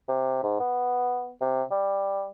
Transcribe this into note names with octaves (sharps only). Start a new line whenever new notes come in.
C3
G#2
B3
C3
G3